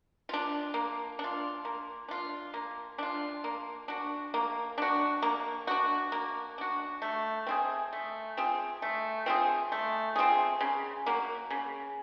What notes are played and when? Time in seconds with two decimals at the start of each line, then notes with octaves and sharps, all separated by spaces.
0.29 D4 F4
0.74 A#3
1.19 D4
1.24 F4
1.65 A#3
2.08 D4 F4
2.54 A#3
2.98 D4 F4
3.44 A#3
3.88 D4 F#4
4.34 A#3
4.78 D4 F#4
5.22 A#3
5.67 D4 F#4
6.12 A#3
6.58 D4 F#4
7.02 A3
7.47 C4 F4 G#4
7.93 A3
8.37 C4 F4 G#4
8.82 A3
9.26 C4 F4 G#4
9.72 A3
10.16 C4 F4 G#4
10.61 C#3
11.06 F#3 A#3
11.50 C#3